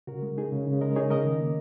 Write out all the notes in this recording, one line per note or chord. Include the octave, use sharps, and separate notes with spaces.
C#3 F#4 A#4
G#3
D#4 G#4
C#3
C#3
G#3 A#4 D#5
D#4 G#4 C#5
C#3 A#4 D#5
D#3
A#3